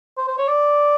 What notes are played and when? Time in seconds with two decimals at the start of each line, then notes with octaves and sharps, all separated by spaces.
0.18 C5
0.28 C5
0.38 C#5
0.48 D5